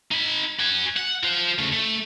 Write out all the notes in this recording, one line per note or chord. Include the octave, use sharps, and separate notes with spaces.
D#4 B5
F#4 G#5
F#5
F4 C5
C#3 A3
A3